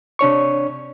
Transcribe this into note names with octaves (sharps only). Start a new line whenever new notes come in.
C3 D4 C#5 C#6